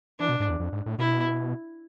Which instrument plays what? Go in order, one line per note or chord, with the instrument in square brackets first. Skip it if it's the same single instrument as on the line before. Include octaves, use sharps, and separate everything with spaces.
[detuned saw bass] E3 [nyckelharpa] D4
[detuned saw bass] B2
G#2
E2
F2
G#2
A2
[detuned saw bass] B2 [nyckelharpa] E4